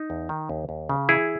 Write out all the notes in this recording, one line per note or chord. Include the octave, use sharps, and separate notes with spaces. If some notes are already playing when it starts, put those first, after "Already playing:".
Already playing: D#4
E2
D#3
D#2
D#2
C#3
E3 E4 G#4